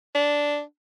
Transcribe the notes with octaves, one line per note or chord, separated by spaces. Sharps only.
D4